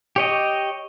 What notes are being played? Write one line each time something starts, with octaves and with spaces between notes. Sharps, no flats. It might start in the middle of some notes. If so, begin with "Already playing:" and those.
G4 C#5 D#5